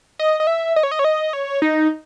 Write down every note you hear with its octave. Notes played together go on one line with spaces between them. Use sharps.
D#5
D#5
E5
D#5
C#5
D#5
C#5
D#5
C#5
D#4